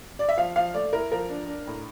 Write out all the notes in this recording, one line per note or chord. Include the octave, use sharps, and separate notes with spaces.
D5
E5
F3 F5
F3 F5
A3 D5
E4 A#4
F3 A#4
D4
D4
A2